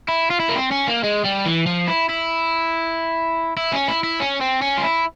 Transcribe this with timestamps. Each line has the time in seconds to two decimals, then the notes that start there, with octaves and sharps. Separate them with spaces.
0.08 E4
0.30 F4
0.40 E4
0.49 A#3
0.55 C4
0.71 C#4
0.88 A#3
1.03 G#3
1.24 G3
1.46 E3
1.66 F3
1.88 E4
2.09 E4
3.57 E4
3.73 C#4
3.88 E4
4.04 E4
4.20 C#4
4.41 C4
4.62 C#4
4.78 F4
4.84 E4